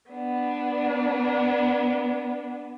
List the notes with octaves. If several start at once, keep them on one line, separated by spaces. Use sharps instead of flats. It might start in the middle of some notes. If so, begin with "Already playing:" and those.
B3 D4